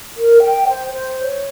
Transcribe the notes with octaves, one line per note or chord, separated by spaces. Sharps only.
A#4
G5
C5
C5
C#5